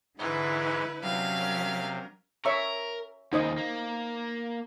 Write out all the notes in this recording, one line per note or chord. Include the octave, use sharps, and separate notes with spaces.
G#2 D3 E3 E4 B4
C3 F#3 C#4 D4 F5
A#4
A#4 C#5 E5 C#6
D#2 C#3 D#4 C5 D#5
A#3